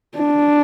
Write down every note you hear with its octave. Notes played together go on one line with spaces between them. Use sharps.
D4